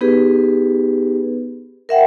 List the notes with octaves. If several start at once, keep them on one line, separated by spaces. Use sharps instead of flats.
B3 D#4 G4 G#4 B4
A#4 E5 F#5 G5